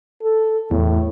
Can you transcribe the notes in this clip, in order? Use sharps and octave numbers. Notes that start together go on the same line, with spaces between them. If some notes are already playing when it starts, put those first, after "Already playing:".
A4
E2 A2